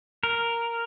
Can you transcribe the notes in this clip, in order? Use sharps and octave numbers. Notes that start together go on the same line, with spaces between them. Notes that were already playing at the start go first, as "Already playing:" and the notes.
A#4